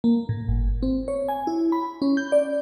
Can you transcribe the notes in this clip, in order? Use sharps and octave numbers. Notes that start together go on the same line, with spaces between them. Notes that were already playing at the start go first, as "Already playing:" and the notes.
A#3
A2
G1
C4
C#5
G#5
E4
B5
C#4
G6
D5